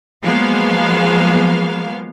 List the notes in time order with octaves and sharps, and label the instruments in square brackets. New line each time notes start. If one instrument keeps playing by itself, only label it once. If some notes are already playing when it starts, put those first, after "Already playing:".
[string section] F3 F#3 G#3 A#3 B3 F5